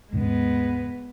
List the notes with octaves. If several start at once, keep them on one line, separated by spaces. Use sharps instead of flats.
D#2 G#2 C#3 G#3 B3